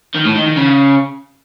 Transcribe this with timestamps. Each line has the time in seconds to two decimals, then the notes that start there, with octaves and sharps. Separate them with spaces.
0.15 D#3
0.25 A2
0.36 D#3
0.46 D#3
0.57 C#3